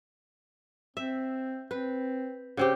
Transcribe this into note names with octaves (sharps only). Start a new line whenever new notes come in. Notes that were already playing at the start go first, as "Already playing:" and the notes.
C4 E5
C4 B4
C#3 C4 G4